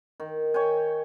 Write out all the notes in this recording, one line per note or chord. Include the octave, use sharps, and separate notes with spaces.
D#3
C#5 G5 G#5